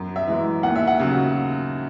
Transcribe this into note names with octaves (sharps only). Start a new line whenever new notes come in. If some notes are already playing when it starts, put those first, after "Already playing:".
Already playing: F#2
E5
E3 G#3
D#2 F#5
E5
F#5
C#3 F#3